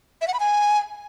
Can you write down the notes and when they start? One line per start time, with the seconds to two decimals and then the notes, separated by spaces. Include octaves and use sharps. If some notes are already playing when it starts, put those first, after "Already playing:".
0.22 E5
0.28 F#5
0.34 B5
0.40 G#5